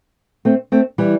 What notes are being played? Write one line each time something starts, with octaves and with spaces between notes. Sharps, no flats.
A3 C4
A3 C4
E3 G3